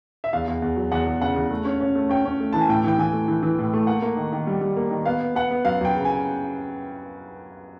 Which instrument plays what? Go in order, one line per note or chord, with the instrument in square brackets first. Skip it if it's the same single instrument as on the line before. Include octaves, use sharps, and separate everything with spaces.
[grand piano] E5
E2 F5
E2
E2
F#3
E2 F#5
E2
C#3 F#5
E2
A3
C#4
C#4
A3
C#4 G5
C#4
A3
E3 A5
G#5
A2 G5
E3 G5
E3 G#5
A3
E3
E3
A2
A3
A#3 F#5
A#3
D#3
D#3
G3
G3
A#3
D#3
B3 F5
B3
B3 F#5
B3
F#2 F5
F#2 G5
C#3
G#5